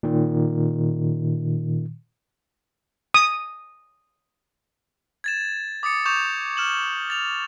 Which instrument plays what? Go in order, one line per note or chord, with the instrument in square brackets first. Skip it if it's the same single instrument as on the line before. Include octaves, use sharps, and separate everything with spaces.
[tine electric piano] A#2 D#3
[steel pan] D#6
[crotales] G#6 A6 E7
D6 D#6 A6 C#7
C#6 D6 G6 E7 F7
F6 E7 F#7
A6 F7